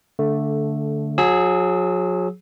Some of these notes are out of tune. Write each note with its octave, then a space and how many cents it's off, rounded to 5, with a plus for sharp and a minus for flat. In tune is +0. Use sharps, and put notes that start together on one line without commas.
D3 -15 A3 +0
F#3 -35 G#4 +0 E6 -20